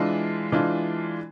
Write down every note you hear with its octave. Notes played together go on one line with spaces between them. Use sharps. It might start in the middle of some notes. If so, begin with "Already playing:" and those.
Already playing: E3 G#3 D4 F4
E3 G#3 D4 F4